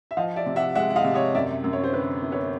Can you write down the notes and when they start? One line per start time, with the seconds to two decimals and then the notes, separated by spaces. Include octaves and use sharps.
0.11 E5
0.17 F3 D#5 F5
0.36 D5 E5
0.46 C3
0.56 E5 F#5
0.75 G#3 E5 F#5
0.90 F#5
0.96 D#5 F5
1.04 C3
1.14 C#5 D#5
1.35 F#2 D5 E5
1.64 F#2
1.73 C#5
1.84 C5
1.92 D3 B4
2.22 B3
2.32 B4 C#5